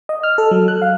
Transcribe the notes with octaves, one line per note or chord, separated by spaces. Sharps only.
D#5
F6
A4
F#3
F#6
F5